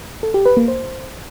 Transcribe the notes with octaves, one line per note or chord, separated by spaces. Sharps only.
A4
G4
B4
A#3
C5